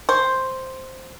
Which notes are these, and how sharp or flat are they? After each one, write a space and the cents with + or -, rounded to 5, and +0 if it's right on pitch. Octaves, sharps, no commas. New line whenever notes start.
C5 +0 C#6 +0